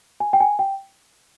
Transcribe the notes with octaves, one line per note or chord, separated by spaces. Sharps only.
G#5
G5
G#5
G5